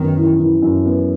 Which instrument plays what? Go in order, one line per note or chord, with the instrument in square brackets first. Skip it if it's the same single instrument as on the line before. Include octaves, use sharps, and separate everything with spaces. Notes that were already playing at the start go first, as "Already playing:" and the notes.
Already playing: [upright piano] F#2 B3 [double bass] D#3
[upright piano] E3
E3
F#2
B3